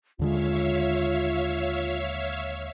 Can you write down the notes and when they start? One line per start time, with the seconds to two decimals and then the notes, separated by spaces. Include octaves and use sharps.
0.19 D#2 D3 G#3 F4 C#5 E5 F5